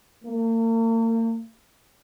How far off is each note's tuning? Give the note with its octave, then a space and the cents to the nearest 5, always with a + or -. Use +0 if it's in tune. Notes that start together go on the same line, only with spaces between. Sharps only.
A#3 -40